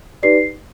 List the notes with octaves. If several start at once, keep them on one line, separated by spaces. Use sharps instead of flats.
D#4 G4 B4 D5 C7